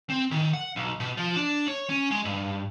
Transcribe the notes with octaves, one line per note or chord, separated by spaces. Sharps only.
C4
D#3
F#5
B1
B2
F3
D4
C#5
C#4
G#3
G2